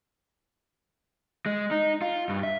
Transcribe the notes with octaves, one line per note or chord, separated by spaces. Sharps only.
G#3
D#4
F4
G2
E5